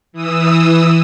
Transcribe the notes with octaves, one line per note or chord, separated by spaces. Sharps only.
E3 D#6 E6